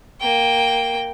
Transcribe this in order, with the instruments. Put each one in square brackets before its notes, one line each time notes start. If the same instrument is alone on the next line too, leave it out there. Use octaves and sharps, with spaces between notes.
[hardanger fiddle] A#3 G5